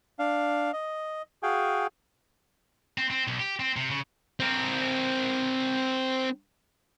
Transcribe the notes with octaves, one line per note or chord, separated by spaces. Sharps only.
D4 F5
D#5
F#4 G#4 F5 G5 G#5
C4
C4
B1
G4
C4
C3
C#3
C4 A#4